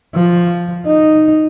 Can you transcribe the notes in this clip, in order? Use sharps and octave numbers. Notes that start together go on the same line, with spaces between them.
F3
D#4